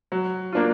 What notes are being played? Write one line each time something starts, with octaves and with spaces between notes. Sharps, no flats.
F#3
A#3 D4 F4